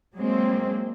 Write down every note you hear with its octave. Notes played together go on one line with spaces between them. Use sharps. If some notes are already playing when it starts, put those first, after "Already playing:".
F#3 G#3 A#3 C4